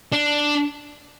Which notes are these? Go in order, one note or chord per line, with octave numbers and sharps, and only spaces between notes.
D4